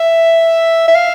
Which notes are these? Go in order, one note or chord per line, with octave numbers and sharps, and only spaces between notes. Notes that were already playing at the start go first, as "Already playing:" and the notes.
Already playing: E5
E5
F5